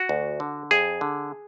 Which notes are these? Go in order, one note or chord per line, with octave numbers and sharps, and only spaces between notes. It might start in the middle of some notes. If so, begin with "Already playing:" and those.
Already playing: F#4
D2
D3
F2 G#4
D3